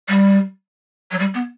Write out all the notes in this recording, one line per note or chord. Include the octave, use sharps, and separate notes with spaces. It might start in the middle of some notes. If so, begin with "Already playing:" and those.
G3
F#3
G3
B3